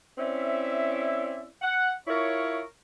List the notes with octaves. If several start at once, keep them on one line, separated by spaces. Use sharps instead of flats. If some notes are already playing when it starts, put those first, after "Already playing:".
C4 C#4 E4 D5 E5
F#5
E4 F4 A#4 C#5